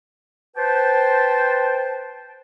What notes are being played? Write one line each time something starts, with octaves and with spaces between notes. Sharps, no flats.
B4 C5 G5 A5